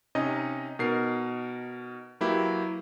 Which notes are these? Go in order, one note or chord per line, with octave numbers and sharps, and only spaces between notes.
C3 C#4 D#4 D#5
B2 D#4 A#4 C7
F#3 A#3 E4 G4 B4